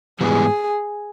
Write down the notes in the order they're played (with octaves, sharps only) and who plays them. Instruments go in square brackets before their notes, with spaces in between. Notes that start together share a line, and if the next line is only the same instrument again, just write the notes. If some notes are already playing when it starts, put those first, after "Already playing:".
[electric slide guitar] G#2 E3 G3 B3 [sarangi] G#4